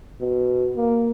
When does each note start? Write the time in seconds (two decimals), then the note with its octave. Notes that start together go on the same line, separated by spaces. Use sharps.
0.21 B2
0.77 A#3